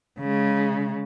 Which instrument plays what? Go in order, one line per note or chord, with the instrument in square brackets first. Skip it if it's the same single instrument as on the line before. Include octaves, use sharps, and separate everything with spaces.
[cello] C#3 G#3